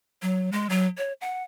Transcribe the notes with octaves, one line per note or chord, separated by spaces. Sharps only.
F#3
G#3
F#3
C#5
F#5